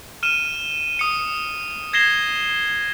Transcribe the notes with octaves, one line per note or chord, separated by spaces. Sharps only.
F6 D#7 E7
D#6 C#7
G#6 A#6 C7 E7 G7